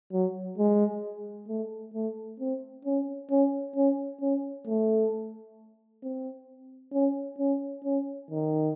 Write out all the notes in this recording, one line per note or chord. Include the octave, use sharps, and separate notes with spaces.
F#3
G#3
A3
A3
C4
C#4
C#4
C#4
C#4
A3
C4
C#4
C#4
C#4
D#3